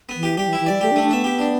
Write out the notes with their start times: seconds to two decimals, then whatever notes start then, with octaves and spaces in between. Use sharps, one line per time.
0.09 B3
0.16 E3
0.23 G4
0.37 G3 G4
0.48 E3
0.53 E4
0.60 E3
0.66 G3 D5
0.81 A3 G4
0.91 D4
0.96 A3
1.03 D4
1.11 B3 E5
1.24 G4
1.39 D4